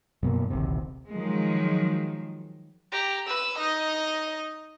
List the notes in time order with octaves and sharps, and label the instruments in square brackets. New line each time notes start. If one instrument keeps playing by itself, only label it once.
[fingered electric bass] F#2 B2 A#3
D1 A#1 D#2 C3
[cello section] D#3 F3 F#3 G#3
[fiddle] G4 A#5
[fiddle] B4 [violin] E6
[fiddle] D#4 [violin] D#5